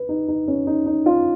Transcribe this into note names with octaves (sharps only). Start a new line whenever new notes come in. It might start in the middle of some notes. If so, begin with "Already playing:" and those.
Already playing: B4
D#4
D#4
C#4
D#4
D#4
F4